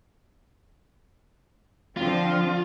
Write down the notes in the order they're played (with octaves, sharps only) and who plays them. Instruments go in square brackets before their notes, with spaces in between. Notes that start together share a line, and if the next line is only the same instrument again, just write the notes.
[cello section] D3 F3 C4 [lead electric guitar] F4